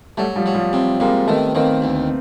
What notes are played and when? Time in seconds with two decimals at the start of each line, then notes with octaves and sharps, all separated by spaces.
0.17 F#3 G3 A3
0.36 F3 G3
0.46 F#3
0.54 F3 G3
0.73 C3
1.00 C3 G#3 A#3
1.27 D#3 A3 B3
1.55 D#3 A#3 C4
1.82 D2